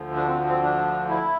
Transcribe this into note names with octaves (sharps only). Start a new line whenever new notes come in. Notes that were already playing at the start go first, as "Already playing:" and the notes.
Already playing: D2 D3 F3
D4
C4
C4
D4
E4